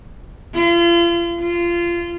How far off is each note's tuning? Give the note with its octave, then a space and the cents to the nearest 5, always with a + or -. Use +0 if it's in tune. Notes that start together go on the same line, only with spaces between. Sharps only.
F4 -40
F4 -20